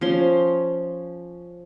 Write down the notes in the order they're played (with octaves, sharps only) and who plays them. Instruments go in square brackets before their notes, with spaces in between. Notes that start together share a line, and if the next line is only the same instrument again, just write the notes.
[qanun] F3 C#4 C6